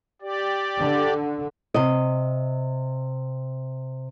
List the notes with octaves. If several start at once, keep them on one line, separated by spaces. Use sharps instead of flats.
G4 D5
D3
C3 D#5